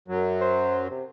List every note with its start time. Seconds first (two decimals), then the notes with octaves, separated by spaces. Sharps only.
0.08 F#2 F#3
0.41 C5
0.90 C3